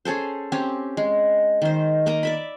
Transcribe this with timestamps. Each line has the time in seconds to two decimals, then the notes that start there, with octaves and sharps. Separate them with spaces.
0.05 C#4 G#4 A4 C5
0.52 C4 C#4 G4
0.97 G#3
1.62 D#3 C5
2.06 A#3 A#4 D#5 A#5
2.23 D5 E5 B5